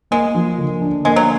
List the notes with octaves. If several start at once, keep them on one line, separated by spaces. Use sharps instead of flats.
G#3 A#3
F3
D3
D4
G#3 A#3
F#3